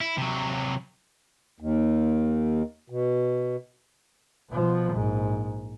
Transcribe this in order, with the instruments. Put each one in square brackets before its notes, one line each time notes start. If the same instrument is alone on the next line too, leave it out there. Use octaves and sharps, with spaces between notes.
[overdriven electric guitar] E4
C3 F#3
[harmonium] D#2
B2
[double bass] B2 F3
A#1 G#2